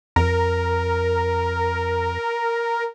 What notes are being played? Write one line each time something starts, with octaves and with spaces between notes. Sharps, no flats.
F2 A#4